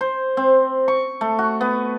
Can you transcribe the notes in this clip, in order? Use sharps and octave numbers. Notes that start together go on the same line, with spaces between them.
C5
C4
C#6
A3
F#4
B3